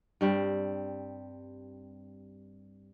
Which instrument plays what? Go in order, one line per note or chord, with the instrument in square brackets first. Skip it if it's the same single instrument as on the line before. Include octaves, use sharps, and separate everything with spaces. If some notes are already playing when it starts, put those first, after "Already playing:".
[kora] G2 G3 C4